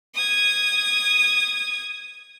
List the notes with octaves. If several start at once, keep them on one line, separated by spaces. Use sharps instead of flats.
D#6 G#6